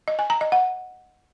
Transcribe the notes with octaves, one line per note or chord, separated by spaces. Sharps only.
D#5
G#5
A#5
D#5
F#5